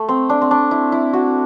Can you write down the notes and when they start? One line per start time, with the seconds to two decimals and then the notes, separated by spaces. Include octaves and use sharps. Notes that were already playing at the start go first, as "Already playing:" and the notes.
Already playing: A3
0.09 C4
0.29 D4
0.42 C4
0.51 D4
0.71 E4
0.92 E4
1.13 F#4